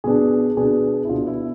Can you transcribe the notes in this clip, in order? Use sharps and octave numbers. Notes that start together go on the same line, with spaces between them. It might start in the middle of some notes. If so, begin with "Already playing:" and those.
B2 B3 D4 G#4
B2 B3 D4 G#4
E4
B2 B3 D4 F4
E4